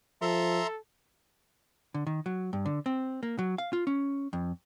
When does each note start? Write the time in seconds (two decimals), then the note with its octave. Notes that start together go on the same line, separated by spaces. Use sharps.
0.22 F3 A4 E5 A#5 C6
1.94 D3
2.07 D#3
2.26 F#3
2.53 G2
2.66 D3
2.86 C4
3.23 A#3
3.39 F#3
3.58 F5
3.73 F4
3.87 C#4
4.33 F2